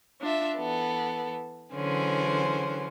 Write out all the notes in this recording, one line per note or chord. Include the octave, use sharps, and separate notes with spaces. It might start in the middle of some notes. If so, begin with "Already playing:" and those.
D4 F4 E5
E3 B3 A4
D3 E3 F#3 C#4 G#4 C5